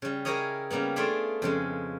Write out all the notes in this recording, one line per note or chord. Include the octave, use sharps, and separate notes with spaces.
C#3 G3
E4 G4 G#4 A#4 C#5 D#5
C#3 G3 A#3 B3
A3 D4 F4 G#4 D5 E5
F2 C#3 G#3